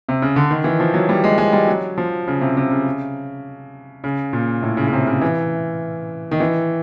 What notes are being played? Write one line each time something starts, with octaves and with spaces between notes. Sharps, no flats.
C3
C#3
D3
D#3
E3
F3
F#3
G3
G#3
G#3
G3
F#3
F3
C#3
C3
C3
C#3
C#3
A#2
A2
C#3
C#3
C3
C#3
E3
D#3
E3